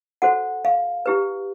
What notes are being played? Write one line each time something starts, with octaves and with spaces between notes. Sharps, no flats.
F#4 A4 C5 F#5
F5
E4 G4 B4